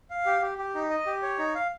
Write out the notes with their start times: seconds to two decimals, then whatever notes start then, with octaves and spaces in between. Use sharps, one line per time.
0.10 F5
0.26 G4
0.42 G4
0.58 G4
0.75 D#4
0.90 D#5
1.06 G4
1.22 C#5
1.38 D#4
1.55 F5